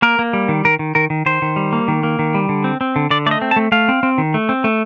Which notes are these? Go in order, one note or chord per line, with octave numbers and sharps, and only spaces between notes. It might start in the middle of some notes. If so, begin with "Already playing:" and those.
A#3 A#4
A#3
G3
D#3
D#3 A#4
D#3
D#3 A#4
D#3
D#3 C5
D#3
G3
A#3
D#3
A#3
D#3
G3
D3
C4
C4
D3
D3 D5
A3 D5
D#5
C4
A5
A3
A3 F5
C4
C4
D#3
A3
C4
A3